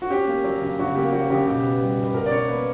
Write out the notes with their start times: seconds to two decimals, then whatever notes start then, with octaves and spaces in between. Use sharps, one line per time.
0.02 F#4
0.10 C#4 G4
0.28 A#3
0.44 F#3
0.61 C#3
0.79 C#3 F#4
0.95 A#3 G4
1.07 G4
1.12 F#3 F#4
1.30 C#3 G4
1.46 B2 G4
1.63 B3
1.81 G3
1.98 B2
2.04 B4
2.14 B2 A#4
2.26 D5
2.31 C#4 C#5
2.48 A#3 B4